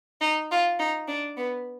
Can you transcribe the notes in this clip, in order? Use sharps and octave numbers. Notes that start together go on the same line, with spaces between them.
D#4
F4
D#4
D4
B3